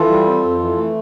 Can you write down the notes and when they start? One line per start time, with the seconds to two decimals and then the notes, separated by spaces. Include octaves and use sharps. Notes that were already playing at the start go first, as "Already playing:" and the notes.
Already playing: E3 F4 A4
0.09 G3
0.26 C4
0.42 F2
0.60 E3
0.77 A3